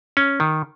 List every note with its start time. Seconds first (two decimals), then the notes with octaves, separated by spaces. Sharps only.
0.17 C#4
0.40 D#3